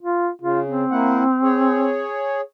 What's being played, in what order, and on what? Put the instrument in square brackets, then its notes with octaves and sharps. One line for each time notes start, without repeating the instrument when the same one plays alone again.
[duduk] F4
[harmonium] C#3 [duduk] F4
[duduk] C4
[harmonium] A#3 E4 F#5
G#4 C#5